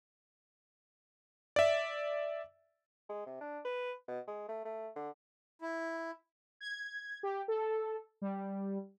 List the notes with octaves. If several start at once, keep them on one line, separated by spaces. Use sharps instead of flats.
D5 E5
G#3
C3
D4
B4
B2
G#3
A3
A3
D3
E4
G#6
G4
A4
G3